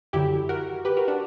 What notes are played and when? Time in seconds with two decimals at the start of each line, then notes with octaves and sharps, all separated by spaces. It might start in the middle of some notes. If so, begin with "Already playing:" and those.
0.13 F#2 D3 F#3 E4 G4
0.49 F#4 A#4
0.85 G4 B4
0.97 F#4 A#4
1.08 D4 F#4